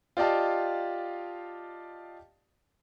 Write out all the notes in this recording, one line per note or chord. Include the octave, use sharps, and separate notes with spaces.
F4 G4 D5 D#5 F5 A5